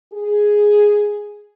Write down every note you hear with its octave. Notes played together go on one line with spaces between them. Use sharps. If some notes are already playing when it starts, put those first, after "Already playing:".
G#4